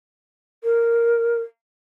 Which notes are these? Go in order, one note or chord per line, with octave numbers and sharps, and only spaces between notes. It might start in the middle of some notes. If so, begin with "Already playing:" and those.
A#4